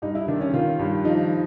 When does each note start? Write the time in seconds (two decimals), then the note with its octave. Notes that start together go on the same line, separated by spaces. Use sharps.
0.02 G2 D#4
0.15 E4
0.28 D#3 D4
0.41 C#4
0.54 D#3 F4
0.79 G2
1.05 F3 D#4